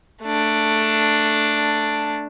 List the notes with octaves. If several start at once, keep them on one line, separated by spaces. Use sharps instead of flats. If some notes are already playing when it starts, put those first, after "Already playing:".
A3 D4